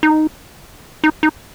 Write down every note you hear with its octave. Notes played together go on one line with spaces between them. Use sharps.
D#4
D#4
D#4